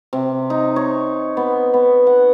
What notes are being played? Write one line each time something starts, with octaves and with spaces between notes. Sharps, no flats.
C3
D#4
C#5
B3
B3
F#5